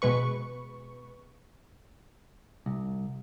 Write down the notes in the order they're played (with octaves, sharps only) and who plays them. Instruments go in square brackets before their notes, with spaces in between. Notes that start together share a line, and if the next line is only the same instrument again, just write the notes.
[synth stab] B2 G#3 B4 C#6
[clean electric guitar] C2